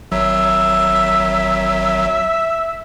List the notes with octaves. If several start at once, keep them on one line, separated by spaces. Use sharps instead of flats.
G#1 F#3 E5